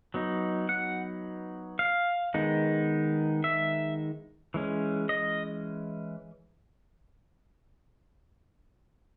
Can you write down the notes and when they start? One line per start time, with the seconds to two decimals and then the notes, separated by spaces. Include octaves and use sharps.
0.14 F#3 B3 D#4
0.69 F#5
1.79 F5
2.34 D#3 G#3 B3 D#4
3.44 E5
4.54 E3 G#3 C#4
5.09 D#5